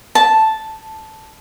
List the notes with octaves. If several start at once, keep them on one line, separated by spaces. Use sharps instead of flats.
A5